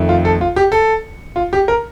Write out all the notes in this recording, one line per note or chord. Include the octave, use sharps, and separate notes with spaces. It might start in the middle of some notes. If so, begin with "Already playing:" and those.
Already playing: F2 D#3 A3
F4
A4
F4
G4
A4
F4
G4
A#4